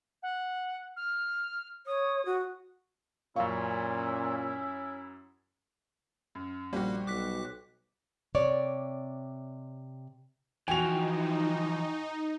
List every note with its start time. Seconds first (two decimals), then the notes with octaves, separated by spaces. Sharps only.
0.23 F#5
0.96 F6
1.87 C#5 D#6
2.26 F#4
3.36 F#2 A#2 C#4 E4 F5 C#6
6.35 F#2
6.73 A#1 G3 A#3 F#4 G4 C5
7.07 B1 D6 F#6 B6
8.35 C3 C#5 D5
10.68 E3 F3 D#4 F#4 G5 G#5 F7